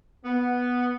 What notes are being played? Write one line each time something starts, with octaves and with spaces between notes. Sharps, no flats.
B3